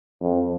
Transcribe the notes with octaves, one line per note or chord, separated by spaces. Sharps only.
F2